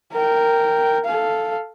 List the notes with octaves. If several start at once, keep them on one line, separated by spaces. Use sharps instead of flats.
A#4 G5
A4 F5